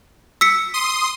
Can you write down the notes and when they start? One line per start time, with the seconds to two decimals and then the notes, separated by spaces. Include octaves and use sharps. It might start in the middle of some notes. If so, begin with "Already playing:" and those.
0.41 E6 B6 C#7
0.74 C6 D#6